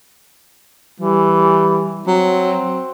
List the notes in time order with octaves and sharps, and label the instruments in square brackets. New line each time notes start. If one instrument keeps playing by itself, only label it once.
[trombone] E3 [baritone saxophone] G3
[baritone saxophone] F#3 [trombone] C4